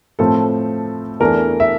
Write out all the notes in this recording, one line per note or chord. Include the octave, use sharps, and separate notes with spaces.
A2 F3 C4 A4
E2 E3 A3 D4 A#4
E5